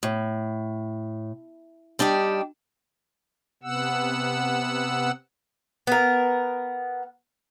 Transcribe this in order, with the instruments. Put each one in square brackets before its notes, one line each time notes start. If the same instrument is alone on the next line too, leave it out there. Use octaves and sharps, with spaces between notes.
[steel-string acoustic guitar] A2
G3 D4 D#4 G4
[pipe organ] C3 B3 F#5 E6
[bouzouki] B3 A#4